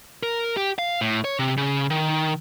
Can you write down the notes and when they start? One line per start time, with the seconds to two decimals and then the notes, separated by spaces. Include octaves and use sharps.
0.23 A#4
0.57 G4
0.79 F5
1.01 A2
1.24 C#5
1.39 C3
1.57 C#3
1.90 D#3